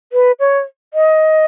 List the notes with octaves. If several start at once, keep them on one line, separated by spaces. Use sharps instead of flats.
B4
C#5
D#5